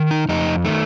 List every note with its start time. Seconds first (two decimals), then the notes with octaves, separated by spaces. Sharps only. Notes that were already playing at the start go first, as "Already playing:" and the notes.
Already playing: D#3
0.11 D#4
0.29 F2 D#4
0.65 D#3 A3